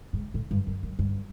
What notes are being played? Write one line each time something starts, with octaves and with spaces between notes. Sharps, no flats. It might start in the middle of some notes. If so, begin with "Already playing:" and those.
G#2
A2
G2
F#2
F#2
G2